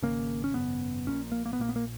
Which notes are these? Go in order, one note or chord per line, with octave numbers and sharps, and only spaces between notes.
G#1 F#2 C#3 A#3
C#4
G#1 F#2 C#3 B3
A#1 A#2 C#4
A#3
A#3
B3
A#1 A#2 A#3
B3
A#3